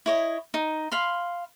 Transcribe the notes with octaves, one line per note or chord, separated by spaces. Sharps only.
E4 C#5 D#5
D#4
F5 B5 C6